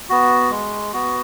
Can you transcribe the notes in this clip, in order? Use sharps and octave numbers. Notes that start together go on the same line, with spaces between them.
B3 F#4
G#3
B3 F#4